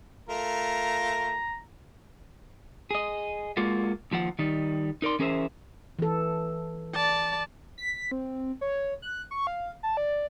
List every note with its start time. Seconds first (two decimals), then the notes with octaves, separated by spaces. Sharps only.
0.29 A3 F4 A#4 A#5
2.91 G#4 D#5
3.57 G#3 A#3 F4 F#4
4.11 D#2 F3 F4 F#5
4.39 D#3 G3 D#4
5.02 D#4 A#4 D5 C6
5.19 E3 C#4 G#4 A#4 C5 E5
5.99 E3 A4
6.94 D5 A5
7.78 B6
8.11 C4
8.61 C#5
9.02 F#6
9.31 C#6
9.47 F5
9.83 A5
9.97 D5